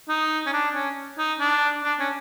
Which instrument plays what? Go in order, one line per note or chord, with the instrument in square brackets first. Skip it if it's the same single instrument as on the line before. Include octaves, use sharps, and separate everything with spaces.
[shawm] D#4
C#4
D4
C#4
D#4
D4
D4
C#4